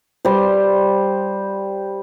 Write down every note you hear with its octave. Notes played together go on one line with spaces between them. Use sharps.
G3 C5